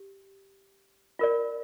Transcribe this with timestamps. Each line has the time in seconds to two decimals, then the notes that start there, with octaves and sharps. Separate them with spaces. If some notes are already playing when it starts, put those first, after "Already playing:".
Already playing: G4
1.19 F4 A#4 D5